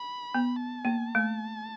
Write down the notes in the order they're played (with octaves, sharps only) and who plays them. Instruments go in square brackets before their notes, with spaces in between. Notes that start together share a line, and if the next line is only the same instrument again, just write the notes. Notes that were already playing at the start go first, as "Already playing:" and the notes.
Already playing: [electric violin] B5
[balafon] B3
[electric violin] A5
[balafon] A#3
A3